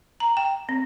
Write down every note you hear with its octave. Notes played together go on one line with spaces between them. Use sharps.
A#5
G5
C4